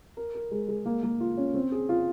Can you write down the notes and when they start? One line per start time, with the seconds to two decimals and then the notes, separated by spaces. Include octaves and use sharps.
0.17 A#4
0.34 A#4
0.51 G#3
0.68 G#3
0.86 A#3
1.03 A#3
1.20 F4
1.37 C#4
1.54 C4
1.72 G#4
1.89 F4